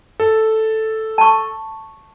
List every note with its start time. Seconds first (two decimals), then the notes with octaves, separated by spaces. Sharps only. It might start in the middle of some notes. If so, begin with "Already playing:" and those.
0.20 A4
1.18 A5 C#6